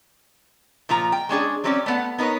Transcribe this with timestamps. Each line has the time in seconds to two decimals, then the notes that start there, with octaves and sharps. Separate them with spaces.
0.89 A#2 F3 F4 A#5
1.12 G5
1.29 G#3 C#4 D4 G#4
1.64 F#3 G3 C4 C#4 G4 D5
1.86 A3 B3 F#5
2.18 B3 D#4 A#4 B4 C#5